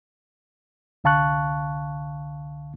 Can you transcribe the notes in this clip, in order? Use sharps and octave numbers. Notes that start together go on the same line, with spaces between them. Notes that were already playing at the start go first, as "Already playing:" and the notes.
C2 D3 F5 A5 C#6 F#6